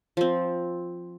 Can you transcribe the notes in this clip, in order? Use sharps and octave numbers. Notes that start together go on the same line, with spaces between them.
F3 C4